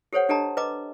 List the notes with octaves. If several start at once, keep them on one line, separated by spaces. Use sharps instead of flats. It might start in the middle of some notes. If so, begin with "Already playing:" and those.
G4 A4 C5 C#5 F#5
D4 G4 A4 D#5 A5 A#5
B4 D#5 A#5 D6